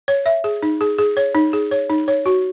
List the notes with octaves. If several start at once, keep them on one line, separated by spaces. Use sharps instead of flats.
C#5
E5
G#4
D#4
G#4
G#4
C#5
D#4
G#4
C#5
D#4
C#5
F#4